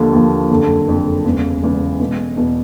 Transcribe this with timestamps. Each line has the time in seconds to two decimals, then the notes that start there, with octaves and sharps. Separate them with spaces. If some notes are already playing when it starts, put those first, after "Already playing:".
Already playing: D#2 D3 F3
0.13 D#2 D3 F3
0.50 F#1 F2 D3
0.87 F#1 F2 D3
1.25 E1 E2 C#3
1.62 E1 E2 C#3
2.00 E1 E2 B2
2.37 E2 B2